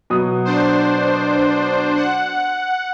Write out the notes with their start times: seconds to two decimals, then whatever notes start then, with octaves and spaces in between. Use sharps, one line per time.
0.10 B2 F#3 D#6
0.45 D4 C5
1.96 F#5